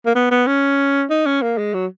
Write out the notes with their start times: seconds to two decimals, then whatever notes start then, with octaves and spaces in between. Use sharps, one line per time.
0.06 A#3
0.15 B3
0.31 B3
0.47 C#4
1.10 D#4
1.26 C#4
1.42 A#3
1.58 G#3
1.74 F#3